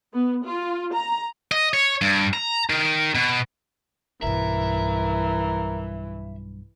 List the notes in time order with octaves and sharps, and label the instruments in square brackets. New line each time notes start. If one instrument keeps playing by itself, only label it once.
[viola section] B3
F4
A#5
[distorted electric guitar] D#5
C#5
G2
A#5
D#3
B2
[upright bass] B1 G2 [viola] E3 [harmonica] A#4 [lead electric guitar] E5